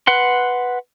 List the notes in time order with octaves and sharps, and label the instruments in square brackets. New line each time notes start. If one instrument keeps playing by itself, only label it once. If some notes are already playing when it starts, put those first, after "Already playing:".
[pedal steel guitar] B4 F#5 C6